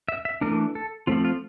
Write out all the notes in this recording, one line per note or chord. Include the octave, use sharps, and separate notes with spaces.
E5
E5
E3 A3 D4 A#4
A4
F3 A3 C4 F4
F4